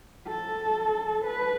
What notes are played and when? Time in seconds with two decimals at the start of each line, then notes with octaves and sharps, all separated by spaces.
0.27 A4
1.25 B4